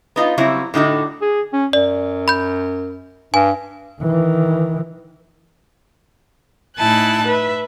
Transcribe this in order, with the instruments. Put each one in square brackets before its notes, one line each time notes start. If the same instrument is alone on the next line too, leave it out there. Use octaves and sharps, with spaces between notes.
[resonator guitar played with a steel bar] B3 D#4 F4
C#3 F#3 G3 C4 E4
A2 D3 D#4 F#4
[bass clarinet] G#4
C#4
[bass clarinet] F#2 [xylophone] D5
[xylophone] B5 G6
[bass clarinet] G2 [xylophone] G#5
[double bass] D#3 E3
[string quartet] A2 D#4 E4 G#5 A5 F#6
B4 E5